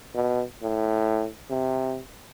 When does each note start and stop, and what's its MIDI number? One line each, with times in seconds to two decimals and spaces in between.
0.15 0.44 47
0.62 1.27 45
1.50 2.01 48